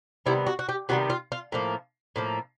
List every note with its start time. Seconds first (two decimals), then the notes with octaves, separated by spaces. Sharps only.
0.26 C3 D#3 G3 B3 E4
0.47 F#4
0.59 F#4
0.69 G4
0.89 C3 D#3 G3 B3 F#4
1.10 F4
1.32 F4
1.52 A2 F3 A#3
2.16 A2 F3 A#3